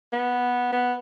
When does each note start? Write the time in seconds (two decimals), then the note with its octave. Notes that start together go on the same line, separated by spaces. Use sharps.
0.12 B3
0.72 B3